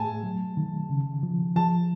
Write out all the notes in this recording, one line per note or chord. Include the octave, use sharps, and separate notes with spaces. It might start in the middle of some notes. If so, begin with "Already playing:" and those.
Already playing: A2 A3 G#5 A5
F#3
D#3
C#3
F3
F3 A5